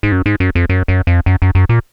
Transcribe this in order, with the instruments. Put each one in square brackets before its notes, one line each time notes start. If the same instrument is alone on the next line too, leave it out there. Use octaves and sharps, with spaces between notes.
[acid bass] G#2
F#2
G#2
F#2
F2
F#2
F#2
F2
F#2
F#2
F#2
A#2